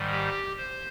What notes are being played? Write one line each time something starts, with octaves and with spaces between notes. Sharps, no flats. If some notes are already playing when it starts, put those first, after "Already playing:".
Already playing: G#2 D#3 G3
G4
C5